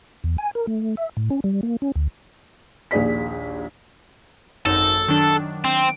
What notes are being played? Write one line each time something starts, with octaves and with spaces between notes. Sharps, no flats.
E2
G#5
A#4
A3
E5
A2
C#4
G3
A#3
C#4
D2
A#1 D#2 G#4 D5 B6
G#1 F#2 D#4 A4
D#3 F#3 D4
C4